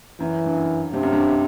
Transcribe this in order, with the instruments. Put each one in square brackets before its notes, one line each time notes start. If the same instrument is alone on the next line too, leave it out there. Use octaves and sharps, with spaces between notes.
[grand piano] F#2 [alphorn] E3
[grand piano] G2
F#2
[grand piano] G2 [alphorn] C3
[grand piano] F#2
G2